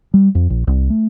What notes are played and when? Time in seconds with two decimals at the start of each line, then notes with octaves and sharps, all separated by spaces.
0.14 G3
0.35 F2
0.50 A#1
0.67 C2
0.90 A3